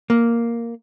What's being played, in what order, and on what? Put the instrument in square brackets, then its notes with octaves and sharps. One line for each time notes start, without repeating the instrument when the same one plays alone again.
[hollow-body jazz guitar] A#3